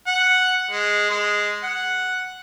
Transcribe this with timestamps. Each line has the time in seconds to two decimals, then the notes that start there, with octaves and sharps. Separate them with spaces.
0.07 F#5
0.71 G#3
1.10 G#3
1.63 F#5